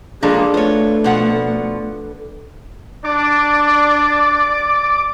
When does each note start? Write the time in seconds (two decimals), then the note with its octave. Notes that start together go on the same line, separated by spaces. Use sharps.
0.23 F3 G#3 A#3 D4 G#4 A4 B5
0.54 A3 F4 B4 C#5
1.04 B2 F3 F#5
3.05 D4 D5 D6